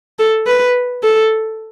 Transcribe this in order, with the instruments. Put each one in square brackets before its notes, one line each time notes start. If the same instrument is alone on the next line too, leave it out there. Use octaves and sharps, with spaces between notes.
[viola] A4
B4
A4